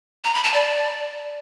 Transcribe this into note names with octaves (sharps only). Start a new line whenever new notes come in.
A#5
B5
A5
D5